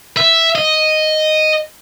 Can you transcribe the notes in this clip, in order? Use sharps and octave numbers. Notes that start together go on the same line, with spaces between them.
E5
D#5